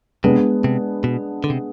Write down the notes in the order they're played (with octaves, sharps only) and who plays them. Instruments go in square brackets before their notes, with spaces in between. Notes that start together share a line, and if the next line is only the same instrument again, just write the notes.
[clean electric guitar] C3 [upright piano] G#3 B3 D4 G#4
[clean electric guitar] C3
B2
D3
C3